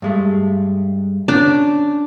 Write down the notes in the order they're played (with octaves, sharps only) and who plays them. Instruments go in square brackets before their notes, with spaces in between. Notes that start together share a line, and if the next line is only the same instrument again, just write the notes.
[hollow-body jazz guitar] G2 G#3 A3
[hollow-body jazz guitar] C#4 [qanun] D4